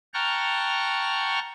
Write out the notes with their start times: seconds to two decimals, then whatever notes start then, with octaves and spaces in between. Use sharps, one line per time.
0.14 F#5 G5 A5 A#5 C#6 F6